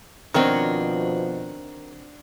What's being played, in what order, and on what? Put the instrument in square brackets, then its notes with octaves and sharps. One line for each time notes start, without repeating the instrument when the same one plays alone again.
[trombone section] B2 F3 [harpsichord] D#3 [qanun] C4 A#4 C#5 [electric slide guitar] D4 F#4